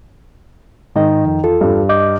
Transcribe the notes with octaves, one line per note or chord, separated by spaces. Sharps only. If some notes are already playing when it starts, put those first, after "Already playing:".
G#2 D#3 D#5
F2
E2 F4 A4
G2
D#5 D6 G6